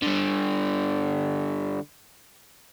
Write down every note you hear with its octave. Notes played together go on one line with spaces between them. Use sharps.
D3 G3